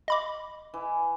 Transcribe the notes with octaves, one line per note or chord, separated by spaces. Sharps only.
D#5 B5 D6
E3